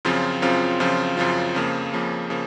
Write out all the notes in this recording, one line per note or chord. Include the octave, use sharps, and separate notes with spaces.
F#2 C#3 F3 C4 F4
F#2 C#3 F3 C4 F4
F#2 C#3 F3 C4 F4
F#2 C#3 F3 C4 F4
F2 C#3 F3 A#3
F2 C#3 F3 A#3
C#3 F3 A#3